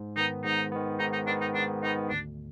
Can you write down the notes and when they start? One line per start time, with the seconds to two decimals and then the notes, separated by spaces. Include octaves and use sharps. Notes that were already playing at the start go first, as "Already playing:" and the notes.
Already playing: G#2
0.16 D#3 B3 D#4
0.44 G#2 D#4
0.72 D#3 B3
0.99 G#2 D#4
1.13 D#4
1.27 D#3 B3 D4
1.41 D#4
1.54 G#2 D4
1.83 D#3 D#4
1.87 B3
2.10 D2 D4